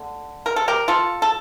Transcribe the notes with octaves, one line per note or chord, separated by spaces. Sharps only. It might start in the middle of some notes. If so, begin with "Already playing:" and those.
Already playing: D3 A3
A#4
A4
G4 A#4
F4 A4
A4